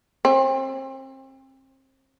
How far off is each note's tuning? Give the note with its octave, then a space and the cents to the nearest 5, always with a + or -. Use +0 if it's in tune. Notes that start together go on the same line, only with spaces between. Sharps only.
C4 +35